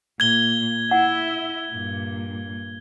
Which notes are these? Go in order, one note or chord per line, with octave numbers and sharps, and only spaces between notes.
A#2 G#6 G7
E4 E5 F#5
G2 A#2